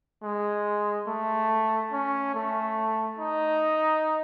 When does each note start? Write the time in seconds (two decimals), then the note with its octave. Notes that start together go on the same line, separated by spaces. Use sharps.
0.23 G#3
1.07 A3
1.92 C#4
2.34 A3
3.19 D#4